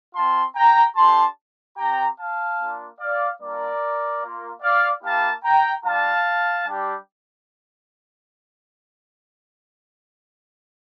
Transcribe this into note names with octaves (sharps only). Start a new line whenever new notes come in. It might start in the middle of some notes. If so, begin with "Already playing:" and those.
C4 F4 A5 C6
G5 A#5
A3 D4 G4 A5 C6
C4 G4 G5 A#5
F5 A5
A#3 D4 F4
D5 F5
G3 A#3 D4 F4 A#4 D5
A#3 F4
D5 F5
A#3 E4 G4 F5 A5
G5 A#5
G3 D4 F4 F5 A5
G3 D4 G4